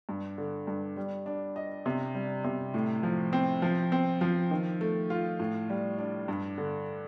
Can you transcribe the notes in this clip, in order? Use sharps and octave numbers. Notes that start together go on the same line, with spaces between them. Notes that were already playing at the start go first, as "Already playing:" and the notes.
G2
D3
G2
G3
D4
D#5
C3
G3
C3
A2
F3
C4
F3
C4
F3
D#3
A3
F4
A2
G3
D4
G2
D3